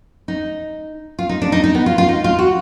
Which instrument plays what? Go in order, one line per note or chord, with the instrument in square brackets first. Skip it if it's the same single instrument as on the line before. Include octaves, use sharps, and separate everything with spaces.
[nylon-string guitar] D#4
F4
D#4
D4
D#4
D#4
B3
F4
F4
D#4
F4
F#4